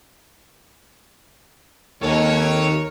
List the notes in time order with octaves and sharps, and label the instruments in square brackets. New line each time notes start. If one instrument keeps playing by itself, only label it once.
[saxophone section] D#2 [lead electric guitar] A4 D#5 [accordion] A#4 [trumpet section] C#5